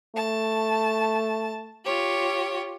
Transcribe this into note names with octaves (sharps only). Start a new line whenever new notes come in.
A3 A5
F4 G4 C#5